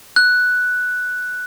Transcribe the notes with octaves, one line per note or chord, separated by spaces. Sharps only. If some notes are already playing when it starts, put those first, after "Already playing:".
F#6